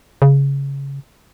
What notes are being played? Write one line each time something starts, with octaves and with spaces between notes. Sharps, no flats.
C#3